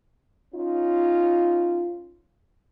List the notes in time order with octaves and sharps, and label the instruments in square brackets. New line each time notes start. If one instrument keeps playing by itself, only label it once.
[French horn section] C#4 D#4 F4